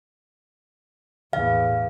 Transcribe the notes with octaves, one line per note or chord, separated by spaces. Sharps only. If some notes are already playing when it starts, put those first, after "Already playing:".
E2 A2 F5